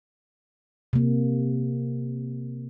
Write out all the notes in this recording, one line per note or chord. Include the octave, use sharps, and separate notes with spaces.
C3 A#3